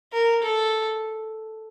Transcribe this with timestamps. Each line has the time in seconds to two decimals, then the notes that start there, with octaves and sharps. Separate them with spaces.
0.12 A#4
0.42 A4